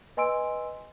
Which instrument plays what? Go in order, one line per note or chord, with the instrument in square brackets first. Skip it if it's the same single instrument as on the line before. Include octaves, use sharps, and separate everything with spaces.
[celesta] B4 D#5 G#5 C6 E6 D7